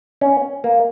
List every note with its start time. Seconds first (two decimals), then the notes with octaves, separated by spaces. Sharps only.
0.21 C#4
0.64 A#3